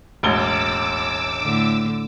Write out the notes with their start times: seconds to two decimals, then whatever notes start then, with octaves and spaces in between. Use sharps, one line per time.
0.23 E1 A1 D6 E6 G7
1.42 A2 D3